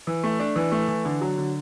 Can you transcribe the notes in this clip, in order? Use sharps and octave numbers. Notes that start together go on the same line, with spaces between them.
E3
A3
D4
E3
A3
E3
D3
F#3
D3